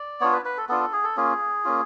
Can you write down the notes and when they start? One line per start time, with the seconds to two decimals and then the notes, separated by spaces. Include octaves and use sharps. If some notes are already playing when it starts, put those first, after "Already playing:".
Already playing: D5
0.21 B3 D4 F4 C#5
0.33 B4
0.45 B4
0.58 A4
0.69 B3 D4 F4 A4
0.80 A4
0.93 G#4
1.04 A4
1.17 A#3 C#4 F4 G#4
1.65 A#3 C#4 F4